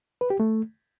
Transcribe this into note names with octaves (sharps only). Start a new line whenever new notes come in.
B4
G4
A3